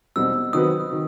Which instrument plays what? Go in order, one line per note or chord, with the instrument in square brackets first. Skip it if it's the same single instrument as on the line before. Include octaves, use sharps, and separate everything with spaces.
[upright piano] E2 B2 G3 C4 D#4 [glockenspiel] E6
[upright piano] D#3 F#3 C4 F#4 B4 [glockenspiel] D#6
[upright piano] D#3